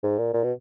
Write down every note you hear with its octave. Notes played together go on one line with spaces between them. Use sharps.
G#2
A#2
A#2
B2